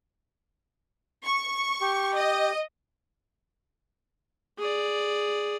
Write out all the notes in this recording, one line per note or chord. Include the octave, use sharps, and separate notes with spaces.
C#6
G4
D#5
G#4 D5